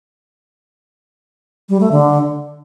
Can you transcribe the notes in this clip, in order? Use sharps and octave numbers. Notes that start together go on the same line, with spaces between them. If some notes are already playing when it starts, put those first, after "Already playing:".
G3
A3
D3